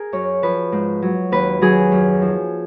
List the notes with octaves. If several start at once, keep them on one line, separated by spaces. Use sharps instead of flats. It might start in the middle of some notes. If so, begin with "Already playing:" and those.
Already playing: G#4 A#4
F#2 C#5
F3 B4
G#2
F#3
D#2 B4
D#3 F#3 G#4
F#2
F3